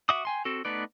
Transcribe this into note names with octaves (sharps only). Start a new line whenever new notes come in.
F#4 E5 F#5 D6 D#6
G5 G#5 C6
C4 F#4 A4
A3 B3 D#4 B4 D5